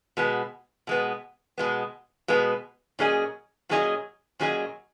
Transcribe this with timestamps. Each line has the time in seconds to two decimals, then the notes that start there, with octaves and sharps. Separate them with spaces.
0.17 B2 G#3 B3
0.87 B2 G#3 B3
1.58 B2 G#3 B3
2.28 B2 G#3 B3
2.99 A#2 F#3 C#4 G#4 D#5
3.69 A#2 F#3 C#4 G#4 D#5
4.39 A#2 F#3 C#4 G#4 D#5